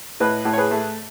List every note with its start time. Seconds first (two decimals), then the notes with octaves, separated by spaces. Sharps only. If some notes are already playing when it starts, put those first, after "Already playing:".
0.20 A2 B4 D#5
0.45 A2
0.53 C#5
0.58 G#4 B4
0.71 A3